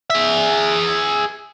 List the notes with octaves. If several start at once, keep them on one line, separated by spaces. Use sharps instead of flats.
G#4 E5